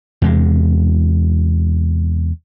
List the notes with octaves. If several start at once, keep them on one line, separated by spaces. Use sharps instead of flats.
E2 C3 G#3